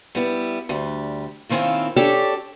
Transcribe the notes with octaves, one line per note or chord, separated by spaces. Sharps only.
G3 B3 E4
D2 G3
A#2 D#3 C4 C#4 E4 F4
C#4 D4 G4 A4 C#5 D5